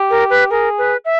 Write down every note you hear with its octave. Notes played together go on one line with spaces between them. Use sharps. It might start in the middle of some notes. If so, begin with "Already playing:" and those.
Already playing: G4
A#4
B4
G#4 A#4
B4
E5